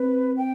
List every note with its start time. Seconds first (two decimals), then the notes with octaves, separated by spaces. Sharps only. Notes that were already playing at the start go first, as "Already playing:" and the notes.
Already playing: C4 B4
0.37 G5